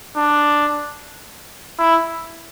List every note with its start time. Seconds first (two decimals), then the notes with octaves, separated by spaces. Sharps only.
0.17 D4
1.79 E4